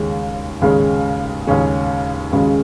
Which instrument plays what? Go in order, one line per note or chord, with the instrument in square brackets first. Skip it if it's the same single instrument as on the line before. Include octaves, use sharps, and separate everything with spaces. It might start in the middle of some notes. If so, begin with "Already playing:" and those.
Already playing: [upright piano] D#2 C#3 G#3 C#4
D#2 C#3 G#3 C#4
D#2 C#3 G#3 C#4
D#2 C#3 G#3 C#4